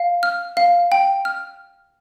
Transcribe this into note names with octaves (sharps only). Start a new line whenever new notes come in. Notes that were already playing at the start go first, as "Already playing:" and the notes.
Already playing: F5
F6
F5
G5
F6